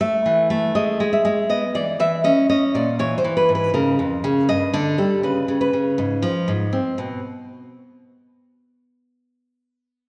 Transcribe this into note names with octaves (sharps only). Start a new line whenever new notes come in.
A3 E5
E3
A3
G#3 D#5
G#3
E5
G#3
B3 D#5
E3 D5
E3 E5
C#4 D#5
C#4 D#5
A#2 D5
E3 C#5
C5
E3
B4
G#2
B4
C#3 A#4
F2
C#3
G2 D#5
D3 A4
G3 A4
C#3 B4
C#3
B4
C#3
G#2
F3
G#2
C4
B2